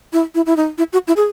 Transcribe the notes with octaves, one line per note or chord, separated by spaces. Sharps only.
E4
E4
E4
D#4
E4
F#4
E4
G#4